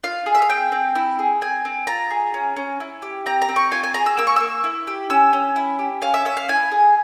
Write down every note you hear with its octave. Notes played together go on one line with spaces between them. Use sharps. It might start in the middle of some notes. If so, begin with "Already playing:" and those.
F4 F5
G#4
E5
F5
C4 G5
C4
E4
G#4
C4 G#5
C4
F4 A#5
G#4
C#4
C#4
E4
G4
C4 A#5
A#5
C4
C#6
F4 G#5
G#5
G#4 A#5
E6
A#3 E6
C#6
A#3 E6
E4
G4
C#4 E6
C#4
E4
G4
C#4 F5
E5
C#4 E5
F5
E4 G#5
G#4